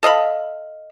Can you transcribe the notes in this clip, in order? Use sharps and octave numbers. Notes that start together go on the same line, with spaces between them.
A4 D#5 F5 B5